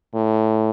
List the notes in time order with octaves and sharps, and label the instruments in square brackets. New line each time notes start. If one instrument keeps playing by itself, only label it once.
[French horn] A2